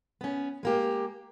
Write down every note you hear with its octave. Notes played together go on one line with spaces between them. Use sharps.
B3 C#4
G#3 A#3 G4